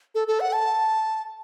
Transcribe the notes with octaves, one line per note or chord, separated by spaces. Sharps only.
A4
A4
F#5
A5